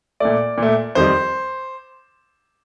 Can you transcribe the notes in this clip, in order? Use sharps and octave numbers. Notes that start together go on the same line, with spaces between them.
A#2 A3 D5
A#2 A3
F2 D#3 G3 C5